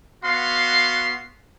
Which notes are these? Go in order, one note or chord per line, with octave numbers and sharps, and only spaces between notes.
B3 F#4 F5 C6